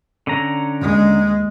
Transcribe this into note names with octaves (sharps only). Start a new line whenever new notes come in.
D3 C#4 A#5
D#2 G#3